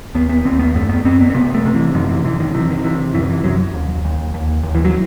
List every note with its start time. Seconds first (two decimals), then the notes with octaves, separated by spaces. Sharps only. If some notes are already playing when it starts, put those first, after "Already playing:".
0.15 D#2 B3
0.29 B3
0.45 D#2 C4
0.59 B3
0.75 F#2 A3
0.89 B3
1.05 F#2 C4
1.20 B3
1.30 C4
1.35 C3 B3
1.54 A3
1.65 C3
1.74 E3
1.94 F#2 D#3
2.09 E3
2.24 F#2 E3
2.40 D#3
2.54 C3 E3
2.70 D#3
2.84 C3 E3
3.14 F#2 E3
3.22 D#3
3.29 E3
3.44 F#2 F#3
3.74 D#2
4.05 D#2
4.34 D#2
4.63 D#2
4.75 E3
4.84 F#3